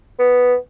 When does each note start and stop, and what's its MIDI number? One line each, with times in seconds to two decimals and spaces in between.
0.19 0.56 59